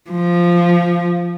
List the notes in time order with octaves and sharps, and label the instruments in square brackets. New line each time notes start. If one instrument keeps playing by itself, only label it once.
[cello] F3